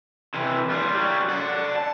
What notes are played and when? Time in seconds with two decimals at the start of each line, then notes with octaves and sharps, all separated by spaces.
0.35 C3 E3
0.70 G3 F4
0.95 F#3 G3
1.29 D5 F#5
1.76 A5